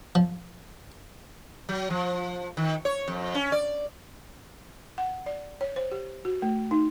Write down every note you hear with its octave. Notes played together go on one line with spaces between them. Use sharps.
F3
F#3
F3
D#3
C#5
F2
C#4
D5
F#5
D5
C#5
C5
G4
F#4
A3
D#4